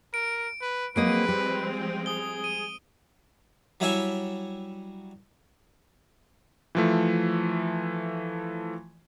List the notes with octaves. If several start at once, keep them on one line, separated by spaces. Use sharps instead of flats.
A#4 D7
B4
F3 F#3 G#3 A#3 C4 B4 D#5 D7
G3
G#4 D#6 G7
D#7
F#3 G3 E4 C#5 E5 G#5
E3 F3 A3